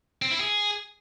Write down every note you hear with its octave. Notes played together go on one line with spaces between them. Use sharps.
C4
E4
G#4